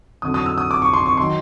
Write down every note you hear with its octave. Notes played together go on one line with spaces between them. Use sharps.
F2 D3 F#3 D#6
D#6
E6
D#6
D6
C#6
C6
C#6
D#3 F#3 C6